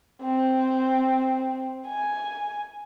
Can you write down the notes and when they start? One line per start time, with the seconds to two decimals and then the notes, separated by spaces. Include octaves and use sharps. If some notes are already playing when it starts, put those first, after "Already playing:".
0.22 C4
1.88 G#5